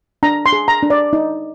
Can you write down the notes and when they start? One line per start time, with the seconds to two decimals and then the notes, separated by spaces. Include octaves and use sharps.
0.23 D4 A#5
0.46 C6
0.53 G#4
0.68 A#5
0.83 D4
0.90 D5
1.13 D#4